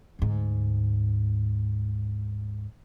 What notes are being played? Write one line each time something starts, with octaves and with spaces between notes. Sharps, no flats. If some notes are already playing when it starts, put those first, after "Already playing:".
D2 G#2